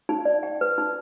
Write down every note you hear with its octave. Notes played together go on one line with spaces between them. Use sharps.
D#4
D5
G5
B4
D#4